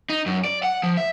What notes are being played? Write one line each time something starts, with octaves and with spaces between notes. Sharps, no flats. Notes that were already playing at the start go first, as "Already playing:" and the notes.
D#4
F#2
D5
F#5
F3
E5